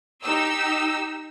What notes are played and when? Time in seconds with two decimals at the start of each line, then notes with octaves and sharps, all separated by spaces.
0.23 D#4 G4 E6